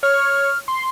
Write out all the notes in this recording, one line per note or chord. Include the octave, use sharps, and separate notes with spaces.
C#5 F6
C6